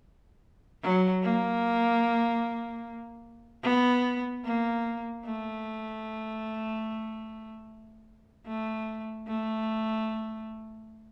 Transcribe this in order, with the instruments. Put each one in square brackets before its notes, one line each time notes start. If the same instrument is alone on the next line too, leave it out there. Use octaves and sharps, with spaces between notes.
[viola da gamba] F#3
A#3
B3
A#3
A3
A3
A3